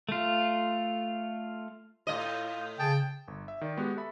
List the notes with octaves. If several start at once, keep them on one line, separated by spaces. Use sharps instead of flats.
A3 F4
A2 F4 D#5
C#3 G#4 G5 A5
G1
E5
D#3 D5
G#3 B3 F#4 G4
A4 E5 B5